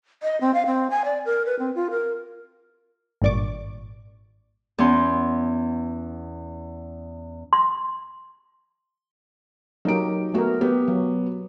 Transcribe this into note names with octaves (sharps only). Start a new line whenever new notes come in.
D#5
C4
F5
C4
G#5
D5
A#4
B4
C4
F4
A#4
G#1 G2 A#2 D5 C#6 D6
E2 B3 C#4 C6
C6
F#3 A#3 D#4 G4 D7
A3 B3 F#4 A#4
B3 G4
F#3